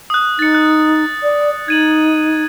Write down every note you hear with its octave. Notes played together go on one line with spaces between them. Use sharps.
D#6 F#6
D#4 A6 C#7
F#6
D5
D#4 G#6 D#7 F#7